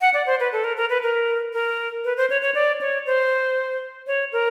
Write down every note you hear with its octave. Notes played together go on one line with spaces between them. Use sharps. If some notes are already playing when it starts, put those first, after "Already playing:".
F#5
D5
C5
B4
A4
A#4
A#4
B4
A#4
A#4
B4
C5
C#5
C#5
D5
C#5
C5
C#5
A#4